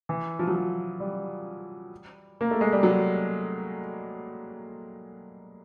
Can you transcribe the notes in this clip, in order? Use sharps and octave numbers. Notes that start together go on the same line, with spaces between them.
E3
F3
F#3
F3
G3
A#3
A3
G#3
G3
F#3